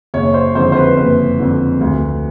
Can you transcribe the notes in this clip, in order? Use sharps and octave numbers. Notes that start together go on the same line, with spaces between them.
F#1 C#5
C5
F2 D3 C5
C5
B4
F#1 B4
F2 D3
D2